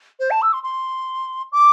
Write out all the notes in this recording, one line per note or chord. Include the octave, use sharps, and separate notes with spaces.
C5
A5
E6
C6
C6
D6